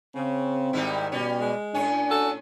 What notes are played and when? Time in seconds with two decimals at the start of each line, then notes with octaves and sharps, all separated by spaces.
0.15 C#3 C4
0.73 G#2 D#3 G3 D#4 E4
1.12 B2 G3 C#4
1.41 G#3
1.74 A2 C#4 D4 G#5
2.09 F#4 A4